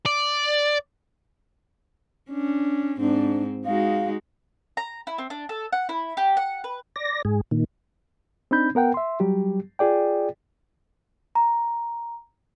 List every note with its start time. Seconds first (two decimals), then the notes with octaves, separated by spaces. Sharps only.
0.06 D5
2.30 C#4 D4
2.99 G#2 C4 D4
3.65 G#3 D#4 F#4 F5
4.77 A#5
5.07 E4
5.18 C4
5.30 D4
5.49 A4
5.72 F#5
5.89 E4
6.17 G4
6.37 F#5
6.64 B4
6.96 D5 A#6
7.25 G#2 G#4
7.51 A#2 D#3
8.51 C4 D4 D#4 B5 G6
8.75 B3 A#4 F#5 G5
8.94 E5 C6
9.20 F#3 G3 G4
9.79 F4 G#4 D5 G5
11.35 A#5